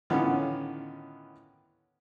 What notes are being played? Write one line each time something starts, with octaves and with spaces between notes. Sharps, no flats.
A2 D3 D#3 B3 C#4 F4